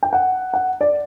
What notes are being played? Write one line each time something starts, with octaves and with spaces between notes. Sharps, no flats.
G5
F#5
F#5
D5